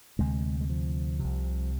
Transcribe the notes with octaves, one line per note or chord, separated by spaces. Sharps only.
D2 C3 G#3
G#3
F3
C2 C3